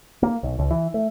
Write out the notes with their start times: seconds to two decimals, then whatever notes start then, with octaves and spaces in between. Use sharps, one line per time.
0.23 A#3
0.43 B1
0.59 C#2
0.71 E3
0.94 A3